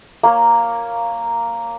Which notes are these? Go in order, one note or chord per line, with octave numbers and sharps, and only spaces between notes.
A#3 C#5